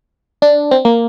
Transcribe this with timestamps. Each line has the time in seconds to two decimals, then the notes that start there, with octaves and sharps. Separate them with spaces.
0.42 D4
0.71 C4
0.85 A#3